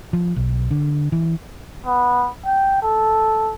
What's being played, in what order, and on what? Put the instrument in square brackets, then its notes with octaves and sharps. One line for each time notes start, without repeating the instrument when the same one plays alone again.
[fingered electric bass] F3
B1
D3
E3
[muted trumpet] B3
G5
A4